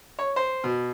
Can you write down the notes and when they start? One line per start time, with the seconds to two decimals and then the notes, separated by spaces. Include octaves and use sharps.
0.19 C#5
0.36 C5
0.64 B2